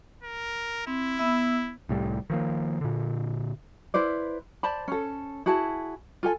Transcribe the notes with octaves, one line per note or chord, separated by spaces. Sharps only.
A#4
C4 E4
B3 E5 E6
C2 A2 G3
D#3 F3 A#3
A#2 D3
E4 B4 C5 D5
C5 D5 A5 B5
C#4 A4
E4 F#4 G#4 A5
F4 A4 G#5